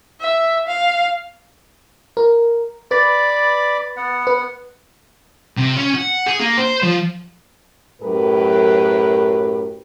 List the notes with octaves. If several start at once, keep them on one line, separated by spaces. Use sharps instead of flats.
E5
F5
A#4
B4 D5 B5 D6 A6
B3 F#5
B4
C3
C#4
F#5
G#4
A#3
C5
F3
F#2 A2 F#3 G4 A#4 B4